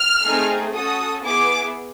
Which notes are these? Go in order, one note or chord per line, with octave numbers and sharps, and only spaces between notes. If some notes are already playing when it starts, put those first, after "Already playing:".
Already playing: F6
A3 C4 D#4 G#4
C#4 F#4 A4 D#6
B3 E4 G#4 D6